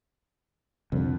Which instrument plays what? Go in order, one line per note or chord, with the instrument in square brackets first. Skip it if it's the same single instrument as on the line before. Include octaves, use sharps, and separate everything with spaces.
[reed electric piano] C2 D3 [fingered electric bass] F2